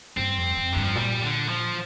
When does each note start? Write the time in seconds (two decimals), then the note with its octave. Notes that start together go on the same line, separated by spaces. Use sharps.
0.17 G2 C4
0.37 F2
0.57 F2
0.73 G2 D3
0.85 F3
0.95 A#2 G3
1.22 D3
1.49 F3